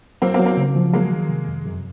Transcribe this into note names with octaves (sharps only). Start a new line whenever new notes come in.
F#3 A#3 C4
A#3 C4
F#3
A#3 C4
C#3
F3
F#3 G#3 A#3
D#3
C3
F2
F#2